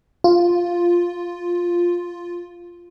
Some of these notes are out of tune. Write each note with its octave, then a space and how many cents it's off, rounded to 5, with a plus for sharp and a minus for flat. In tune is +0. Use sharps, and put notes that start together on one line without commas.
F4 +0